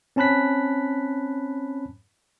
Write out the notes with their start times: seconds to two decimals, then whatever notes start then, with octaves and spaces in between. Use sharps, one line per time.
0.16 C4 C#4 A5 B5 F#6 B6